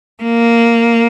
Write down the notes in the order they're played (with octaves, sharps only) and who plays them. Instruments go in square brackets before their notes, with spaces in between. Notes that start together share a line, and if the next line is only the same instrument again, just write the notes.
[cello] A#3